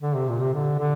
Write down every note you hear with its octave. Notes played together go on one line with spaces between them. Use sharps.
D3
C3
A#2
C3
D3
D3